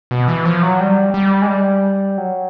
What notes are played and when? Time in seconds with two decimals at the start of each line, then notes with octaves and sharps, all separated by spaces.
0.11 B2
0.28 E3
0.46 F3
0.63 F#3
0.80 G3
1.14 G3
1.42 G#3
1.48 G3
2.18 F#3